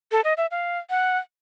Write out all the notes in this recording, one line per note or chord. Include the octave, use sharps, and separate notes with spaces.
A4
D#5
E5
F5
F#5